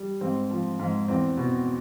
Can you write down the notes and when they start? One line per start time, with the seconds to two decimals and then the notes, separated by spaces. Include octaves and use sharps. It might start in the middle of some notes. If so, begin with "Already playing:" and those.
Already playing: G3
0.21 G#2 C4
0.51 F3
0.80 G#2
1.08 E2 C4
1.37 B2